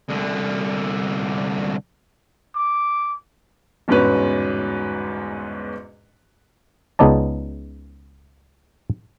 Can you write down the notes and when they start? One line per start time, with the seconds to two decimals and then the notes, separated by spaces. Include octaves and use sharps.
0.09 C2 D3
2.56 D6
3.88 G1 E2 G#2 B2 C#4 B4
6.99 C#2 C#3 B3 D#4 D5 A5